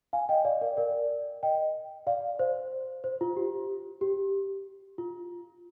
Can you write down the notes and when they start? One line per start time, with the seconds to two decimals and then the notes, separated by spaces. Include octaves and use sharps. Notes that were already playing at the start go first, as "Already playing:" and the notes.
0.13 F5 G#5
0.29 D#5 G5
0.45 D5 F5
0.61 A#4 D5
0.77 A#4 D5
1.43 D#5 G5
2.07 D5 F5
2.39 C5
3.04 C5
3.21 F4
3.37 G4
4.01 G4
4.98 F4